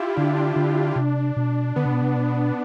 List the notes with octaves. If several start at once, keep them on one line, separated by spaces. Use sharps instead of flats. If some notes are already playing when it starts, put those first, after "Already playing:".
Already playing: E4 F4 G4
D3 D4
E4
D4
D3
C3
B2
D3 B3
C3
B2
C3
B2